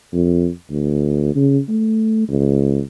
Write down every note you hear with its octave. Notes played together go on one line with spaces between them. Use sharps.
F2
D2
C#3
A3
C#2